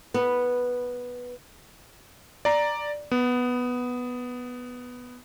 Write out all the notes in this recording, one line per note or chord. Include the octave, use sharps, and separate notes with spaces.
B3
D5 A#5
B3